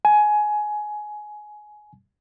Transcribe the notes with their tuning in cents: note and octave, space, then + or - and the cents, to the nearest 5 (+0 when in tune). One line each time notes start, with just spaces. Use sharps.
G#5 +20